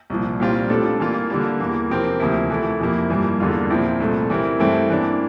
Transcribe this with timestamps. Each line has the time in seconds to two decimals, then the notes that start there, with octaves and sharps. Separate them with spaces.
0.10 C2 A#2 F3
0.40 A#2 G3 C4 F4
0.70 A2 G3 D4 A4
1.00 E3 A#3 F4
1.30 D3 G3 A#3
1.60 E2 E3 A#3
1.90 C3 F3 C4 G4 A#4
2.20 D2 C3 F3 A#3 E4
2.50 E3 A3 E4
2.80 F2 C3 F3 A#3 E4
3.10 G2 E3 G3 A#3
3.40 E2 D3 G3 A#3 F4
3.70 A#2 F3 C4 E4
4.00 C2 A#2 A3
4.30 E3 G3 C4 E4 A#4
4.60 G2 E3 A3 C4 E4
4.90 E3 A#3 D4